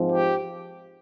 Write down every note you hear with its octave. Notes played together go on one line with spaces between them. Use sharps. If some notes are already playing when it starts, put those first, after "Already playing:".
Already playing: G#2 F3 C4
G4